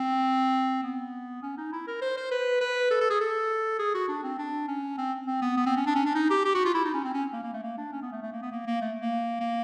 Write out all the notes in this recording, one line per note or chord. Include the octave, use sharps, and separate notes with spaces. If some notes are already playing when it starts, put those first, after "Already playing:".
Already playing: C4
B3
C#4
D#4
E4
A#4
C5
C5
B4
B4
A4
A4
G#4
A4
G#4
F#4
D4
C4
D4
C#4
C4
C4
B3
B3
C4
C#4
D4
C#4
D4
D#4
G4
G4
F#4
F4
E4
D#4
C#4
C4
C#4
A#3
A#3
A3
A#3
D4
C#4
B3
A3
A3
A#3
B3
A#3
A#3
A3
A#3
A#3